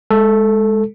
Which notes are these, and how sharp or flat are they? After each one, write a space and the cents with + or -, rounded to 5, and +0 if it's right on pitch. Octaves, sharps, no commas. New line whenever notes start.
G#3 +0 A4 +0